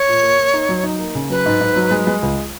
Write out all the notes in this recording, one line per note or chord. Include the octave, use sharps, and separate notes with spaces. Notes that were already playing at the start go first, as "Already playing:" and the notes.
Already playing: C#5
A#2
A#3
A#3
D#4
F#3
D#4
A#3
C#3
F#3 B4
G#2
G#2
F#3
G#3
G#3
C#2